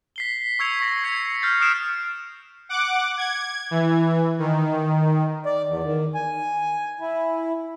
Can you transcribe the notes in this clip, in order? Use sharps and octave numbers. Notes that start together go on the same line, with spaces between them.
B6 C7 G7
C#6 E6 G#6 C#7 F7
C#6 A#6 C#7
G#6 C7 C#7 F7
F6 G6 A6 C7
D#6 F6 F#6 C7 D7 E7
F#5 D6
G#6
E3
D#3
D5
E2
D#3
G#5
E4